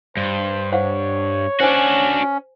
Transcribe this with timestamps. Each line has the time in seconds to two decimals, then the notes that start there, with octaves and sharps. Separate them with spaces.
0.17 G2 C5
0.72 C5 C#5 F5 F#5
1.61 C#4 D4 F#4 C5 G#5